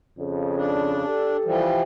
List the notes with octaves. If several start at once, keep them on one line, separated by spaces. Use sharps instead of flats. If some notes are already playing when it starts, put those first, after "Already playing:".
F2 C#3
D4
G4 A4
E3 F3 G3